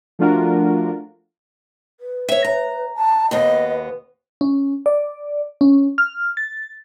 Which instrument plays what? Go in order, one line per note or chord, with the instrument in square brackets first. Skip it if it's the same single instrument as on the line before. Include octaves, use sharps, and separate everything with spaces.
[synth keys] F3 A3 D4 F4 F#4 A#4
[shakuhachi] B4
[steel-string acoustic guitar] C#5 E5
A#5
[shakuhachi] A5
[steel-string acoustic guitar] D#2 B2 B3 [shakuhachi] D#5
[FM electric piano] C#4
D5
C#4
F6
A6